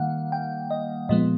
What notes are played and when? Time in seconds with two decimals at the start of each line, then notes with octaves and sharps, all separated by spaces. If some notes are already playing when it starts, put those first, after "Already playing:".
Already playing: D#3 G3 A#3 F5 F#5
0.32 G5
0.70 D#5
1.09 A#2 F3 G#3 B3 D#5